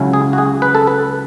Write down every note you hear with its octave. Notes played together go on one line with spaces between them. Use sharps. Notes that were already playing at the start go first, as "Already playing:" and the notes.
Already playing: C#2 C#3 F#3 C#4 E4
G#4
F#4
G#4
B4
A4
B4